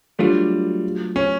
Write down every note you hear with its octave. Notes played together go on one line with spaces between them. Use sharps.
F#3 G3 A3 D4 F4
C#4